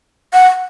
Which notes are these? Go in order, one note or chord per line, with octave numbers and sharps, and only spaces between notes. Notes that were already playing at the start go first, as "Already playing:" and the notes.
F#5